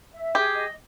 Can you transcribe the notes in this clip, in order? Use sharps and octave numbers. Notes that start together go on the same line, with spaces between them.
E5
G4 G#4
D#5